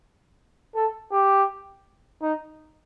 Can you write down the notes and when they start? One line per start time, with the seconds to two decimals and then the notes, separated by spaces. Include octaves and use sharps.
0.75 A4
1.12 G4
2.22 D#4